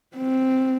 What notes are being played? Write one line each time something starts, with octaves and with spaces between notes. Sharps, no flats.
C4